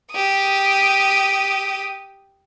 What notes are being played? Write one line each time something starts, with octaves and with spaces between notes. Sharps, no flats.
G4 D#6